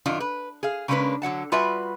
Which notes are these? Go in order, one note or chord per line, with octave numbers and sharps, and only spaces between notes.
F#2 D#3 D4 F4
B4
G#4 F5
C#3 G#3 A#3 C#4 D4 B4
D3 F#3 F#5 A5
G3 F4 F#4 B4 E5 G#5